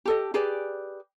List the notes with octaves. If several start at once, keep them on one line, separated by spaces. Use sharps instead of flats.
G4 A4 D#5
G4 G#4 B4 D5